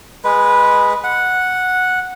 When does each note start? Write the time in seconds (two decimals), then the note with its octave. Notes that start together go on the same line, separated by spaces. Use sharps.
0.24 G#3 B4
1.04 F#5